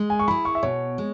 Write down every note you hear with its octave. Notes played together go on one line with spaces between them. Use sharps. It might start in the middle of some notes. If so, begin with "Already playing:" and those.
Already playing: G#3
G#5
C#6
E4 G#4 B5
C#6
E5
B2 C#5
G#3